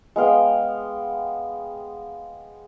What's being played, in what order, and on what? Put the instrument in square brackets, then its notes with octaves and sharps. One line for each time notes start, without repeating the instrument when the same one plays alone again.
[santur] G#3 B3 F5 G5